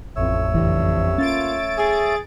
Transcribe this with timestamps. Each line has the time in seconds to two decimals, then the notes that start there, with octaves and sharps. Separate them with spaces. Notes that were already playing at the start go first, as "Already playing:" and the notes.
0.16 A1 F2 A3 C#5 E6
0.54 F#1 G2 E3
1.18 A#2 A#3 C#4 F4 A6 D7
1.78 G#4